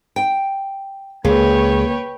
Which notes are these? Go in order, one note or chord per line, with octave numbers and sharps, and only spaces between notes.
G5
C#2 A#3 G#4 B4 C#5 G5